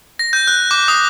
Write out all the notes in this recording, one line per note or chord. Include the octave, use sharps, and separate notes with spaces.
A#6
G6
F#6
D6
D#6